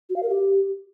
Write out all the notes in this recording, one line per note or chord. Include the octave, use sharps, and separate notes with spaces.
F#4
F5
A#4
G4